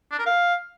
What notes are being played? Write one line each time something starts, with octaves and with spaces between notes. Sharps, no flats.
D4
A#4
F5